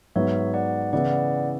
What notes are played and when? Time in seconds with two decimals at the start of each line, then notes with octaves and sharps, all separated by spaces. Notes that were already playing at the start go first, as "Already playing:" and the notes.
0.16 G#2 F#3 B3 C#5 E5
0.54 D5 F#5
0.93 C#3 E3 B3 E4 D5 F#5
1.12 D5 F#5